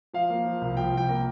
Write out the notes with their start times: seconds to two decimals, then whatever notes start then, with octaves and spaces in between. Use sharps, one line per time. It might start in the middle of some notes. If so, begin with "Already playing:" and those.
0.14 F3 F5
0.30 A#3
0.45 F3
0.61 C2
0.77 F3 G5
0.93 C2 G5
1.09 A#3